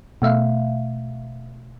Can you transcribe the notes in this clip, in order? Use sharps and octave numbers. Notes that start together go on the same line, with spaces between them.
B2 A3 E5 F5